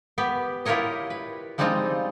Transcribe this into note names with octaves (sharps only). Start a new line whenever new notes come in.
B3 G4 B4
E4 F4 G4 A#4 C#5 D#5
B4
F3 G3 G#3 C4 D#4 F4